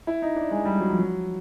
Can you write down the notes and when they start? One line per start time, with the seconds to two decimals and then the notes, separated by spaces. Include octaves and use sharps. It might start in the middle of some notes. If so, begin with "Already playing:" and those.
0.07 E4
0.22 D#4
0.36 D4
0.51 G#3
0.65 G3
0.80 F#3
0.90 F3
0.99 F#3